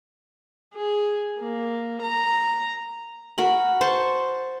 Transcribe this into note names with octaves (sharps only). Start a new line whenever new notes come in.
G#4
A#3
A#5
F#4 A#4 B5
C5 A5 C#6